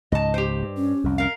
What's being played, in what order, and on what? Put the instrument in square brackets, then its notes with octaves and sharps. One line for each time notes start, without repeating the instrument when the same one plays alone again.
[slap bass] C#2 G#2 [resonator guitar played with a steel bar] D#5 A5
[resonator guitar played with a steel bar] G4 C5
[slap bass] G2
[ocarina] C#4
[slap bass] C2 F2
[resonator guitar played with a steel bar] A#4 F5